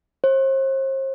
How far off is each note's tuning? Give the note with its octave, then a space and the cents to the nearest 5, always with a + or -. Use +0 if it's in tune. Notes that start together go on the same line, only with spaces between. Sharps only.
C5 +40